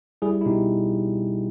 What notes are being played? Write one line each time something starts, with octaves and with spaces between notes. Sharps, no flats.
G3 E4 G#4
E4
B2 D#4 G4